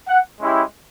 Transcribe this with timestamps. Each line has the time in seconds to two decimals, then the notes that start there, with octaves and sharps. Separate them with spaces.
0.08 F#5
0.40 G#3 C#4 E4 G4